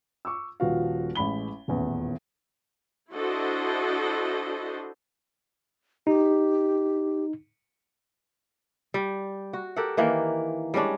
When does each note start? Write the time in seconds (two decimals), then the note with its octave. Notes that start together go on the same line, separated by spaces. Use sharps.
0.25 C#6 D6 E6
0.60 D#1 F3 G3 F#4 B4 F5
1.15 A1 G#3 B5 G7
1.68 D#1 A1 E2
3.13 D4 E4 F#4 A4 C5 D#5
6.07 D#4 G4
8.94 G3
9.53 F#4
9.76 G4 A4 A#4 F#5
9.97 D#3 E3 A#3
10.74 G3 G#3 C#4 D4